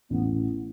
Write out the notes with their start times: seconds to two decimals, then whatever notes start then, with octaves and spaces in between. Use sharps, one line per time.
0.10 A1 B3